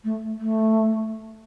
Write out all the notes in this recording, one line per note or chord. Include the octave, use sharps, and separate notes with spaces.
A3
A3